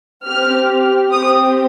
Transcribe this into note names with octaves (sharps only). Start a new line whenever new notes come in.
C4 G4 F6
C4 G4 D#6